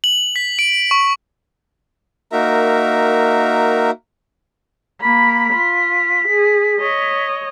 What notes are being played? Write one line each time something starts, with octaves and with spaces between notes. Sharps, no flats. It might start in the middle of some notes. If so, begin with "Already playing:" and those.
F#7
B6
D7
C#6
A#3 D#4 F#4 A#4 E5 A#5
A#3 B5 B6
F4
G#4
C#5 D#5